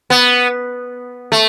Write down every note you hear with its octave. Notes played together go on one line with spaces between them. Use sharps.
B3
A3